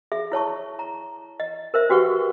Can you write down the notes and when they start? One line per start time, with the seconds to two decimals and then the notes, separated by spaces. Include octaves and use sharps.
0.12 G#4 E5
0.32 E4 C#5 A5 C#6
0.79 A#5
1.40 D#5
1.74 A#4 C5 E5
1.90 C#4 F#4 G4 B4 F#5 C#6